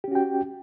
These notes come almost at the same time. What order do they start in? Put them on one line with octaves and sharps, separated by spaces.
G4 C#4 F#4 G5